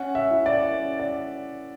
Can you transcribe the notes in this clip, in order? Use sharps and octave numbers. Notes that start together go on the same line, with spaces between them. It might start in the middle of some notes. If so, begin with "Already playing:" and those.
Already playing: C#4 F#5
E5
E4
D5
C#4
D5